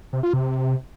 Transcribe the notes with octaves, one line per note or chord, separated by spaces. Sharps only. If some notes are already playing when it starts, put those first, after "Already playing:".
C3
F4
C3